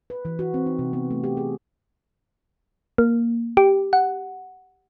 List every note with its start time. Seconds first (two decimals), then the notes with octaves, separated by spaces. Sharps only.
0.10 B4
0.25 E3
0.39 F#4
0.54 C4
0.66 D#4
0.79 C3
0.93 B3
1.11 A3
1.24 G4
1.37 G#4
2.98 A#3
3.57 G4
3.93 F#5